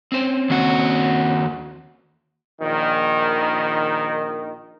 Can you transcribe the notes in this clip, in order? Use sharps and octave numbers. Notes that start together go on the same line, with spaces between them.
C4 C#4 C5
D#2 F#4
A#1 D#3